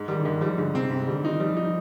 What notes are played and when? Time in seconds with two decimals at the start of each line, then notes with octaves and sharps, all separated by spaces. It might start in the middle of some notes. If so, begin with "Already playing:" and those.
Already playing: G#2
0.08 D#3 G3
0.20 D3
0.25 G#2 D#3
0.41 F3 G3
0.58 G#2 D3
0.74 C3 C4
0.91 G#2 C3
1.07 D3 G3
1.24 D#3 D#4
1.40 F3 G3
1.57 D#4
1.65 F3